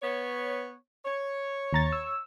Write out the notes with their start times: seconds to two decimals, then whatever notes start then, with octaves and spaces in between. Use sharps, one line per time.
0.03 B3 C#5
1.06 C#5
1.73 D#2 A#5 A6
1.92 E6